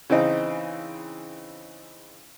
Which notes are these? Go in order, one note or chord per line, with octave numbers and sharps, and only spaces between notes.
C#3 E3 C4 D#4